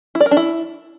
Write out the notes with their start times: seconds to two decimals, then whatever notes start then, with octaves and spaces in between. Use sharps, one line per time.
0.15 E4
0.20 D5
0.26 A#4
0.31 D4
0.37 E4